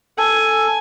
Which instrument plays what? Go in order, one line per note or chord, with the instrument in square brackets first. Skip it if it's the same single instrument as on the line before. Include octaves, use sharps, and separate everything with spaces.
[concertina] A4 [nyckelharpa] G#5